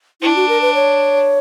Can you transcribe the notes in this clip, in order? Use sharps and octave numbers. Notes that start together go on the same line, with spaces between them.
D4 E4
F#4
A#4
B4
C#5